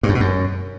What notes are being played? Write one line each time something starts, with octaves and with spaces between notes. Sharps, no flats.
G2
F#2
B2
F#2